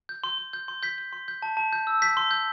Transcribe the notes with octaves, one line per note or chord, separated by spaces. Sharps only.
G6
C6
C6
G6
C6
G6 B6
G6
C6
G6
A5
A5
G6
E6
G6 B6
C6
G6